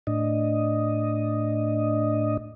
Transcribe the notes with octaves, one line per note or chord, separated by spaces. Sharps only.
A2 D4 D#5